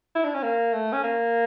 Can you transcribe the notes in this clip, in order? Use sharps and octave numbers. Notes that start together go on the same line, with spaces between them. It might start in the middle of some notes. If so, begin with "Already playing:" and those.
E4
D4
C#4
A#3
A3
C#4
A#3